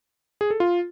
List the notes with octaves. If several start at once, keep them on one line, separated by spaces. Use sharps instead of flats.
G#4
A4
F4